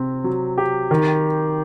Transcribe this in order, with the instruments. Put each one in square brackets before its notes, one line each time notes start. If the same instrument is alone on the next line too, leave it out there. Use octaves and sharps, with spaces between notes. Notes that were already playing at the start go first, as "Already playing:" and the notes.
Already playing: [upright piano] C3 C4
F#3
G4
D#3